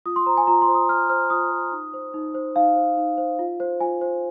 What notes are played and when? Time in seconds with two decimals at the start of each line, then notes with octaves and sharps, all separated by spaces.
0.06 F4 D#6
0.16 C6
0.26 C5 A#5
0.37 G#5
0.47 F4 A#5
0.62 C6
0.68 C5
0.75 D#6
0.89 F4 F6
1.09 C5 F6
1.30 F4 D#6
1.51 C5
1.72 D#4
1.94 C5
2.14 D#4
2.35 C5
2.56 D#4 F5
2.76 C5
2.97 D#4
3.17 C5
3.39 F4
3.60 C5
3.80 F4 G#5
4.01 C5